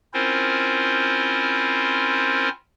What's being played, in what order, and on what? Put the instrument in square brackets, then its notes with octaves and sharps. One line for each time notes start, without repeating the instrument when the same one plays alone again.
[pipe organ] C4 C#4 E4 F4 A#4 C5